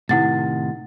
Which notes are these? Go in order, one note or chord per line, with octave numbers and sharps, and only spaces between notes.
A2 C3 D#3 E4 F#5 A6